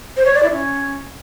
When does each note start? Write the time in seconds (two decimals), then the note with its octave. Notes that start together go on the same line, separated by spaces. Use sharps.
0.17 C5
0.25 C#5
0.34 D5
0.43 E4
0.51 C#4